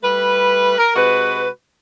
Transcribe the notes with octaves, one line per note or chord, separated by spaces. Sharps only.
G3 A3 B4
A#4
C3 G#3 F#4 B4